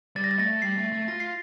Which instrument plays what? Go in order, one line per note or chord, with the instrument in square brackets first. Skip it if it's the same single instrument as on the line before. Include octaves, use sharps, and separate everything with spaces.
[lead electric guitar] G3 [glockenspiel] A6
[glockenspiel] A#6
A6
[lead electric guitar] A3 [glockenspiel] A#6
[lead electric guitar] G3 [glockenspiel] C7
[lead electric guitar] A3
A3
[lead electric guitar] F4 [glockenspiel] A#6
[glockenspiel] C7